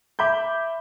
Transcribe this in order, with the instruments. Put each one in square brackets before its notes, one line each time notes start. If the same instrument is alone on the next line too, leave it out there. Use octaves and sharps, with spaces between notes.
[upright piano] E5 B5 D6 G6